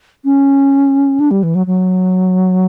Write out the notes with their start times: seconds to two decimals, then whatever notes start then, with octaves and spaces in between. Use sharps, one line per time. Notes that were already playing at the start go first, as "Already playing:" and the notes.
0.25 C#4
1.20 D4
1.31 G3
1.43 E3
1.55 F#3
1.67 F#3